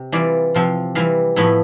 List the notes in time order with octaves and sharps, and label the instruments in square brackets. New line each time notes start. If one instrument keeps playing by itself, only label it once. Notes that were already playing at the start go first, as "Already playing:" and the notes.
Already playing: [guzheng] C3
E3 G3 C4 F4 D5
C3 F3 C4 F4
E3 G3 C4 F5
A2 F3 B3 E4